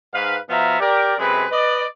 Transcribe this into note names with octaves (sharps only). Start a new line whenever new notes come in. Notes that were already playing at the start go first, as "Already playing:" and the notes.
G#2 B4 F5
B2 F3 B3 E5 F5 A#5
G4 A#4 D5
F#2 C3 G#3 G#4 B4 B5
B4 D5 D#5